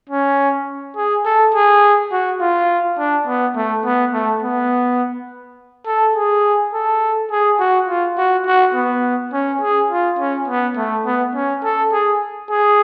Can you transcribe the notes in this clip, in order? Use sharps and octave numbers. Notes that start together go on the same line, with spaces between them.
C#4
G#4
A4
G#4
F#4
F4
D4
B3
A3
B3
A3
B3
A4
G#4
A4
G#4
F#4
F4
F#4
F#4
B3
C#4
G#4
F4
C#4
B3
A3
B3
C#4
A4
G#4
G#4